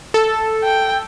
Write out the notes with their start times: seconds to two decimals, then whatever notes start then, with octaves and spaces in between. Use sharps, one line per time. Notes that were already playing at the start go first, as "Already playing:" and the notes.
0.14 A4
0.64 G5